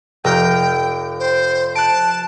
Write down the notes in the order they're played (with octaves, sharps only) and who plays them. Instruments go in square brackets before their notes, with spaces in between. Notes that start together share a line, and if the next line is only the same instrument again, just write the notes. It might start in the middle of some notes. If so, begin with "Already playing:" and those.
[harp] F1 A#5 F6 [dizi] G5
[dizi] C5
[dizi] A5 [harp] F#6 D7